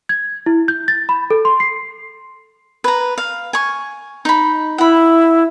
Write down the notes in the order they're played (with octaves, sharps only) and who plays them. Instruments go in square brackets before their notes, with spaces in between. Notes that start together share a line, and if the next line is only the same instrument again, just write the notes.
[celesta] G#6
E4
G6
A6
B5
A4
C6
C7
[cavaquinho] B4 A#5
F5
G#5 C#6
D#4 B5
[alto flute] E4 [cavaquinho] F#5 B5